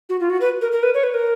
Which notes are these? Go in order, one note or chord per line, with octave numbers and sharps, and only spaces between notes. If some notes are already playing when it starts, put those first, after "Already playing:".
F#4
F4
F#4
B4
A#4
A#4
B4
C#5
B4
A#4